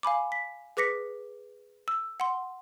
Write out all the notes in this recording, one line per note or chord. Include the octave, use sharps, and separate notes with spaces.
F5 G#5 B5 D6
B6
G#4 B4 D6 A#6 B6 C#7
E6
F#5 C6